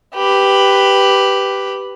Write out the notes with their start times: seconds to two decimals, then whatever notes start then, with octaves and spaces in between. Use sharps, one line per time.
0.14 G4 B4